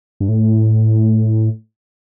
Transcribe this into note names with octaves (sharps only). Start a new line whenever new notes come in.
G2
A2